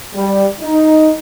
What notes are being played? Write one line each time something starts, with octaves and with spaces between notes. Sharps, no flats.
G3
D#4